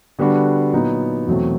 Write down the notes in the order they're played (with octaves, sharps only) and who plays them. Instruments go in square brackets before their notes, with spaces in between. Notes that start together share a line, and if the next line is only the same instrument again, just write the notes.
[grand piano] D3 G3 B3 D4 F#4
A#2 F#3 B3 D#4
E2 B2 F#3 A3 C4